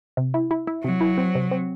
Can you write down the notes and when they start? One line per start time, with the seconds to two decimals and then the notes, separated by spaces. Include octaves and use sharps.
0.17 C3
0.34 E4
0.51 E4
0.67 E4
0.84 C3 F#3
1.01 E4
1.18 C4
1.35 C3
1.51 C4